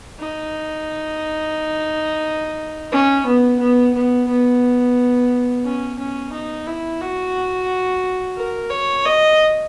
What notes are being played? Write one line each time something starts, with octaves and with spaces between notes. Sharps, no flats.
D#4
C#4
B3
B3
B3
B3
C#4
C#4
D#4
E4
F#4
A#4
C#5
D#5